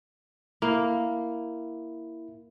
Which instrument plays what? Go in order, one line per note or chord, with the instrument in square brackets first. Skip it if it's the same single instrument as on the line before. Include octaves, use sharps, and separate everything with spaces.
[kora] A#3 [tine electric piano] E4